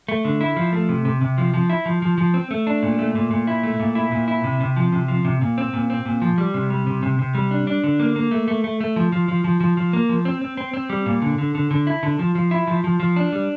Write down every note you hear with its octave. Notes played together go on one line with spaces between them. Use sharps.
A3
D3
E4
F3
A3
C3
C3
C3
F3
F3
E4
F3
F3
F3
C4
A3
D4
A#2
A3
A#2
A#2
E4
A3
A#2
E4
A#2
E4
C3
C3
F3
C3
F3
C3
A#2
C4
A#2
C4
A#2
F3
G3
C3
G3
C3
C3
C3
G3
D4
D4
D3
A#3
A#3
A3
A3
A3
A3
F3
F3
F3
F3
F3
F3
A#3
F3
C4
C4
C4
C4
G3
A#2
D3
D3
D3
D3
E4
D3
F3
F3
E4
F3
F3
F3
D4
G3